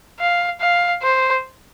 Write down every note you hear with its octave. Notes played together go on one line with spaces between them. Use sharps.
F5
F5
C5